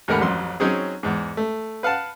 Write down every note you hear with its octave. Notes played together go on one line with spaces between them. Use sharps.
D#2 G#2 A3 A#4 F#5 B5
A1 F2 F#3 C6
F#3 C4 C#4 D#4 G#4
E2 G#2
A3
B4 F5 F#5 A5